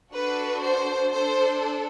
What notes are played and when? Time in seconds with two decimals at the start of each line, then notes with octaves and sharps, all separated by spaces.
0.14 D4 F#4 A4 B4
0.63 C5
1.13 D4 A4 C5